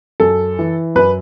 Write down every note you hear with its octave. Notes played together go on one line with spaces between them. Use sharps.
F#2 A4
E3
F#2 B4